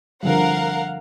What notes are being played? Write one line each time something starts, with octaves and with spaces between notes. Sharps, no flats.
D3 F3 G3 A#4 F5 F#5